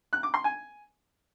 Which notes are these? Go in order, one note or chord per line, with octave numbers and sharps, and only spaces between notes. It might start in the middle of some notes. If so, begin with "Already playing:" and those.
F#6
D6
C6
G#5